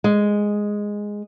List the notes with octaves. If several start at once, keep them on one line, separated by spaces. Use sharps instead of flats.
G#3